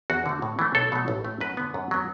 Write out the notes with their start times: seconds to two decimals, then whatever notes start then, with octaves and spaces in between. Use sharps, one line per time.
0.10 E2 F#4
0.26 D3 A3
0.42 A2
0.59 E3 A3
0.75 B1 A4
0.92 B2 F#3 A3
1.08 A1
1.25 A2 A3
1.41 F#2 B4
1.57 D3 B3
1.74 F#2
1.91 F#3 B3